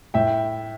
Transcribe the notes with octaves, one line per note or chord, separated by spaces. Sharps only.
A2 E5 G5